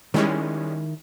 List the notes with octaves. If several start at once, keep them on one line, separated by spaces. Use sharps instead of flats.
D#3 G3 G#3 C#4 E4